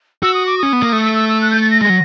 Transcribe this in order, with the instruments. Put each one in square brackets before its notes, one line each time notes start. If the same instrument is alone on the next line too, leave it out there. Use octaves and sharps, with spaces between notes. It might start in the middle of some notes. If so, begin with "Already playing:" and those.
[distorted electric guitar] F#4 [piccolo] E6
[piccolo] D#6
D6
[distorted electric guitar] C#4 [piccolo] D#6
[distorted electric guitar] B3
A#3
A3
[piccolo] E6
E6
E6
F#6
G6
A6
A#6
[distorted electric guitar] G#3 [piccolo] A#6
[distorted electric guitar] F#3